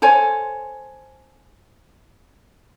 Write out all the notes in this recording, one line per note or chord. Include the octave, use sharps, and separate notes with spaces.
A4 C5 C#5 G#5